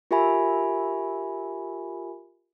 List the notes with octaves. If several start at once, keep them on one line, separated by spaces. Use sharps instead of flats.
F4 G4 A#4 E5 G#5 B5